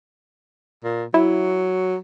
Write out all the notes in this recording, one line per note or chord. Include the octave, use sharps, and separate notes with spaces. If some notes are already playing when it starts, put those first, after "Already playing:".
A#2
F#3 E4